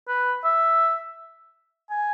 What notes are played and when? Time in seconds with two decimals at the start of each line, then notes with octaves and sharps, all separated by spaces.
0.08 B4
0.44 E5
1.91 G#5